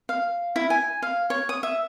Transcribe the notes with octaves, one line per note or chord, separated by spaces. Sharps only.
F5
E4
G#5
F5
C#5
D#6
E5